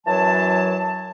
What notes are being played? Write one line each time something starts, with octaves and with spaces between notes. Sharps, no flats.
F#2 E3 F#3 A5